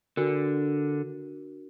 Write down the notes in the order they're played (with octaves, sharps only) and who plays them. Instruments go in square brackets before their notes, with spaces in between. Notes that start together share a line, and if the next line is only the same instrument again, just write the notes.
[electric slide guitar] D3 [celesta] D4 F#4 A#4